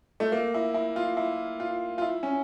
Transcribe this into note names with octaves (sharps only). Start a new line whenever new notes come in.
A3
A#3
E4
E4
F4
E4
F4
F4
E4
C#4